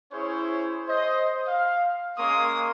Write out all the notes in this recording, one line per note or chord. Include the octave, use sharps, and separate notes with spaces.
C#4 E4 G#4 C5 C#5
C5 D#5
F5
G#3 A#3 C#4 F5 C6 D#6